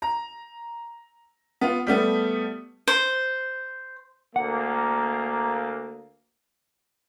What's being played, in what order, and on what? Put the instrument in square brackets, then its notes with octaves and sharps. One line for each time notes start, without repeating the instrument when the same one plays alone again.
[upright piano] A#5
B3 F4
G3 A3 B3
[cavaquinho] C5
[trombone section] D2 A#3 [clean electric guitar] F#5